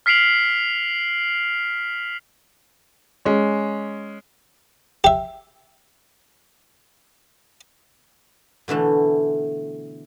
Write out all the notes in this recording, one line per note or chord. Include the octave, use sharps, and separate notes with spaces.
F6 B6 C7 D7 F7 F#7
G#3 C#4
G4 E5
B2 D3 E3 A3